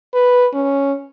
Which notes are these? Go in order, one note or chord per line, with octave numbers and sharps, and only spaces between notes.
B4
C#4